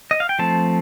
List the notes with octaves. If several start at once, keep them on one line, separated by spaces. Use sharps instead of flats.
D#5
F5
G5
F3 A3 C4 A5